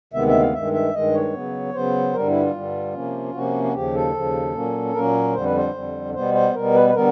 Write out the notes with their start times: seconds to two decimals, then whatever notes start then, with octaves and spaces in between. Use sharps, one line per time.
0.13 D2 C3 D#3 G#3 B3 E5
0.28 E5
0.40 F5
0.53 G2 D#3 G#3 E5
0.73 E5
0.94 G2 D#3 G#3 D#5
1.14 C#5
1.34 C#3 F#3 B3
1.73 C#3 F#3 B3 C5
2.13 G2 D3 G3 A#4
2.28 E4
2.41 F4
2.53 G2 D3 G3
2.94 C3 F3 A#3 C#4
3.34 C3 F3 A#3 C#4 F#4
3.64 F#4
3.74 D#2 C#3 F3 G4
3.95 A4
4.14 D#2 C#3 F3
4.54 A#2 F#3 A#3 C#4
4.94 A#2 F#3 A#3 C#4 A#4
5.33 F2 D3 G3 C5
5.45 B4
5.57 C5
5.74 F2 D3 G3
6.14 B2 G3 B3 C5
6.34 C5
6.54 B2 G3 B3 A#4
6.75 B4
6.89 B4
6.95 D3 G3 B3 A#4